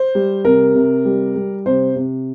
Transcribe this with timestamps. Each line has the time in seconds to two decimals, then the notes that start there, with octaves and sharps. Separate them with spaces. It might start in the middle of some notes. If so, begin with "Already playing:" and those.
Already playing: C5
0.15 G3
0.45 C3 A#4
0.75 C3
1.05 G3
1.36 G3
1.66 C3 C5
1.96 C3